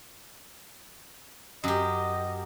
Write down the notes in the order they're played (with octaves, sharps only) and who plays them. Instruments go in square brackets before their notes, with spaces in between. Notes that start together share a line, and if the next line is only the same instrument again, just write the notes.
[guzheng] F#2 G4 [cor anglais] D#5